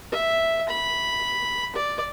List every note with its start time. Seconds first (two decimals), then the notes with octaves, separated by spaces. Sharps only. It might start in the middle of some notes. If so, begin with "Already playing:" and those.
0.12 E5
0.68 B5
1.76 D5